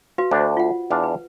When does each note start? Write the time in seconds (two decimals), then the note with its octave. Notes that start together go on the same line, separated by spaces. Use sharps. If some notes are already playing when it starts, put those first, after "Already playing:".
0.18 F#4 B4 F5
0.31 D2 D4 C5
0.57 F4 F#5
0.91 E2 D4 F5
1.03 B4